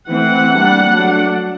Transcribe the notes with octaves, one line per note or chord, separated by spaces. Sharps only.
E3 A3 C4 F#5
G3 A#3 D4
F#3 A3 D4